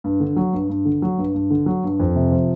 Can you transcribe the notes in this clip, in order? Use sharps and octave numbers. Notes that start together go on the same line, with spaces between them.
G2
D3
F#3
G2
G2
D3
F#3
G2
G2
D3
F#3
G2
F2
C3
F3